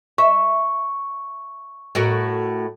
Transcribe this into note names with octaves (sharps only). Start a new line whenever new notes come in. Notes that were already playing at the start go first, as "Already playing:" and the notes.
E5 C#6
A2 F#4 A#4